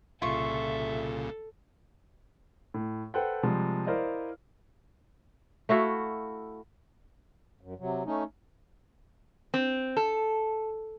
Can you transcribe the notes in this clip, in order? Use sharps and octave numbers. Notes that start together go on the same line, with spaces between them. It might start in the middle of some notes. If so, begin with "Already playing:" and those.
C2 A#2 C#3 F4 A4 E5 C#6
A2
A4 B4 C5 F#5 G5
C3 F3 G3 G#3
E4 A#4 C5 D5 D#5 F5
A3 E4 F#4 F5
F#2
C3 F#3
A3 C#4 D#4
C4
A4